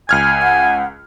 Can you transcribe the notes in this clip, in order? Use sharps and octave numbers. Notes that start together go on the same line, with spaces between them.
C#2 G#5 F6 G#6
F#5